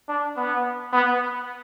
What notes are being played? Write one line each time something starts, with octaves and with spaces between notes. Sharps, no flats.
D4
B3
B3